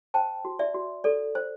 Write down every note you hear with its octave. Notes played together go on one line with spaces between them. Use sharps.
C5 G5 A5
F#4
D5 E5
F#4
A4 D5
C5